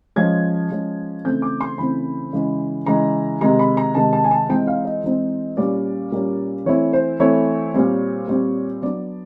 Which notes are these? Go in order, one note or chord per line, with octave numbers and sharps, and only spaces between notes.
F3 G#3 C#4 G#6
F3 G#3 C#4
C#3 E3 A3 C4 G6
D6
C6
C#3 E3 A3 C4 B5
C#3 E3 G#3
C#3 E3 G#3 A#5
C3 D#3 G#3 A#5
B5
A#5
C3 D#3 G#3 A5
A5
G#5
A5
E3 G#3 C4 D#4 G5
F5
D#5
E3 G#3 C4 D#4
A#2 G3 A#3 C#4 D5
A#2 G3 A#3 C#4
E3 A3 C4 E4 C#5
C5
E3 A3 C4 E4 C#5
A#2 G3 C4
A#2 G3 C4
F#3 B3 D4 D5